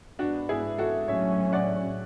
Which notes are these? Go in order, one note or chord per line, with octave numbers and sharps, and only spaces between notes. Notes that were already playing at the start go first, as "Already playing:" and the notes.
G#2 G#3 B3 D4 F#4
E4 G#4
F#4 A4
A2 F#3 C#4 C#5 E5
D5 F#5